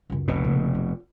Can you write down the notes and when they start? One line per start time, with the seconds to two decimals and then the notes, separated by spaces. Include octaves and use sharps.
0.10 C#2 F#2
0.28 F1 B2
0.44 A#2 C#3
0.75 F4